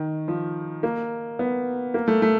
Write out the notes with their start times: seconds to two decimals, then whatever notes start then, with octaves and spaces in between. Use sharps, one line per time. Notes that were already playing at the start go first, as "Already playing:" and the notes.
Already playing: D#3
0.28 F3
0.83 A#3
1.39 B3
1.94 A#3
2.08 A3
2.22 A3